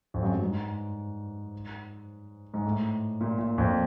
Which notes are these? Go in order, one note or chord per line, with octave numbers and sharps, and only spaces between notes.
F2
F#2
G2
G#2
G#2
A2
A#2
A#2
F2